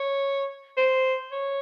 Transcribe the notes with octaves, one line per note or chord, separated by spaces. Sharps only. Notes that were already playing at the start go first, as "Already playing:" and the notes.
Already playing: C#5
C5
C#5